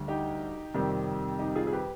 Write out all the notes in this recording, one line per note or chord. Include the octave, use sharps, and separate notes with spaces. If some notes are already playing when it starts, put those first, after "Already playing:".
Already playing: D2 D3 G3
D#4 G4
F2 C3 D#3 G3
D#4 G4
F4 G#4
G#4
G4 B4